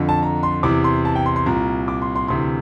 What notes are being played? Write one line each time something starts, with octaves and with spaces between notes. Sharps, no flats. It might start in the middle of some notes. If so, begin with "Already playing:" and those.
Already playing: F2 D3
A5
A#5
C6
E2 C3 E3 D6
C6
A5
G5
C6
C6
C2 A#2 A#5
D6
C6
C6
D2 C3 E3 C6